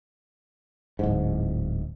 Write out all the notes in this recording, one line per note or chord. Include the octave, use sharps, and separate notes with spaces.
D1 G#2